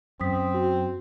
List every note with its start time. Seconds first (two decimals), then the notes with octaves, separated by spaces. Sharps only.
0.21 F#2 C4 D#6 B6
0.54 F#4